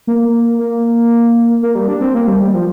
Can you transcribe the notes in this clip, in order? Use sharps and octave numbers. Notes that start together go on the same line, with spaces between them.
A#3
A#3
A#3
G3
D4
C4
A#3
G3
G3
F3